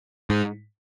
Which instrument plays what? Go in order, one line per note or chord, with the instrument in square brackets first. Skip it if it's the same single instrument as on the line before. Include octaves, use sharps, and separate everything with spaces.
[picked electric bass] G#2